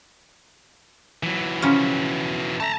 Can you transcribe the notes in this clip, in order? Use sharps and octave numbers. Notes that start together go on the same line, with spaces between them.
E3 F#3
C#3 F3 C#4
A3 A5 A#5